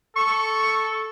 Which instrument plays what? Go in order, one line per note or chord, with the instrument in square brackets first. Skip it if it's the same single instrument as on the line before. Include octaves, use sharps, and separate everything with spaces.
[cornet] A4 [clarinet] C#6